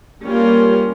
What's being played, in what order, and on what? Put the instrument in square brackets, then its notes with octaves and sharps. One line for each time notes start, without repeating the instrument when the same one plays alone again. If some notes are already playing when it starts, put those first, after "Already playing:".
[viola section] G3 A#3 C#4 F4 A#4